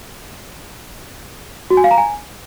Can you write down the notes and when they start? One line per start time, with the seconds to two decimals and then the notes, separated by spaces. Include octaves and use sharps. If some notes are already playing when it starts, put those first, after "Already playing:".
1.70 F#4
1.77 G#5
1.84 F5
1.91 A#5
1.98 G#5